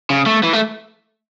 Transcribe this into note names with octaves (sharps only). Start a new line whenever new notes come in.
C#3
A3
E3
A3